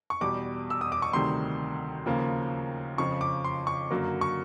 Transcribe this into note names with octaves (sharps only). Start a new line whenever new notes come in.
C#6
E2 B2 G3 D6
E6
D#6
D6
C#6
D2 C3 D#3 G3 C6
D#2 C#3 F3 A#3
F2 C#3 F3 C#6
D6
C6
C#6
F#2 D3 F#3 A#3
C#6